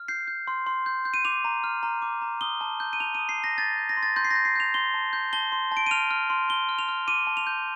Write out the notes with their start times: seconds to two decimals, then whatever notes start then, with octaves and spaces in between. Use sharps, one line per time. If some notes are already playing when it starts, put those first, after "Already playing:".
Already playing: F6
0.08 G6 C7
0.28 G6
0.47 C6
0.67 C6
0.86 G6
1.05 G6
1.14 D#7
1.25 D6 F7
1.45 A#5
1.64 F6
1.83 A#5
2.02 D6
2.22 A#5
2.41 D#6 G7
2.61 A5
2.80 G6
2.93 D#7
3.00 A5 F7
3.15 D#6 D#7
3.29 C7
3.38 A5
3.44 A#6
3.58 G6 A6
3.77 G6
3.89 A#6
3.97 C6
4.03 A6
4.16 C6 G6
4.25 C7
4.31 G6 A#6
4.45 C7
4.56 G6 F7
4.74 C6 G7
4.94 A5
5.13 G6
5.33 A5 G7
5.52 C6
5.72 A5
5.77 D7
5.86 D#7
5.91 F6 F7
6.11 F6
6.30 C6
6.49 C6 G7
6.69 F6
6.79 F7
6.89 F6
7.07 D6 D#7
7.27 A5
7.37 F7
7.47 G6